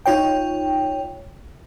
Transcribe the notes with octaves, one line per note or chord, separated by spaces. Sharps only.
D#4 F4 C#5 G5